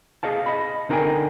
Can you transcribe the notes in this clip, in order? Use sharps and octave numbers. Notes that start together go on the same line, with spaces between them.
G#4 D#5 F5 A5
D#5 B5
D3 D#4 A#4 D5 G5 G#5